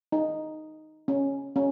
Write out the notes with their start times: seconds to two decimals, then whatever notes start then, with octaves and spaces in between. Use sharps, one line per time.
0.12 D#4
1.08 C#4
1.56 C#4